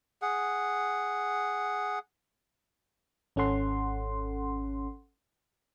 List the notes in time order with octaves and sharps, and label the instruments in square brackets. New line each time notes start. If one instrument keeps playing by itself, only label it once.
[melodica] G#4 F#5
[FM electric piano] G#1 C#4 A4 F#5 C6